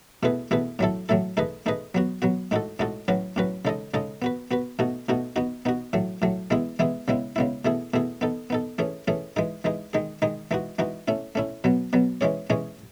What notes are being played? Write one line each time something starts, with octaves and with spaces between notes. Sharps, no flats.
B2 A3 E4 G#4 B4
B2 A3 E4 G#4 B4
A2 F#3 A3 E4 A4
A2 F#3 A3 E4 A4
A3 D#4 G#4 B4 D#5
A3 D#4 G#4 B4 D#5
F#3 B3 F#4
F#3 B3 F#4
A2 G#3 D#4 F#4 A4
A2 G#3 D#4 F#4 A4
A2 F#3 C#4 F#4 B4
A2 F#3 C#4 F#4 B4
C#3 G#3 D#4 A4 D#5
C#3 G#3 D#4 A4 D#5
B3 F#4 B4
B3 F#4 B4
B2 A3 D#4 F#4
B2 A3 D#4 F#4
B3 D#4 F#4
B3 D#4 F#4
A2 F#3 A3
A2 F#3 A3
E3 G#3 B3 E4 G#4
E3 G#3 B3 E4 G#4
C#3 G#3 B3 E4
C#3 G#3 B3 E4
B2 A3 E4 G#4
B2 A3 E4 G#4
B3 D#4 A4
B3 D#4 A4
E3 A3 C#4 G#4
E3 A3 C#4 G#4
E3 G#3 D#4 G#4
E3 G#3 D#4 G#4
D#3 G#3 D#4 G#4
D#3 G#3 D#4 G#4
E3 G#3 D#4 F#4
E3 G#3 D#4 F#4
A3 C#4 E4
A3 C#4 E4
B2 F#3 B3
B2 F#3 B3
E3 G#3 C#4 G#4 C#5
E3 G#3 C#4 G#4 C#5